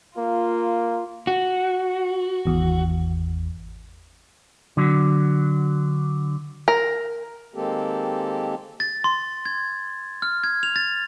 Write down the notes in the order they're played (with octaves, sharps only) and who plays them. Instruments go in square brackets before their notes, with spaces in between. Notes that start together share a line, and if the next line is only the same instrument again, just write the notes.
[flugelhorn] A#3 [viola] F4
[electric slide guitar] F#4
[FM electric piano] G#1 E2
[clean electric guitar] D3 F#3
[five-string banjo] A#4
[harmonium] D#3 G#3 A#3 C4 G4 A4
[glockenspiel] A6
C6
G#6
F6
G#6
F7
A6